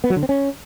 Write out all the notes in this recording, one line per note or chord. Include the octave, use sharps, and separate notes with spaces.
B3
F#3
D3
C4
C#4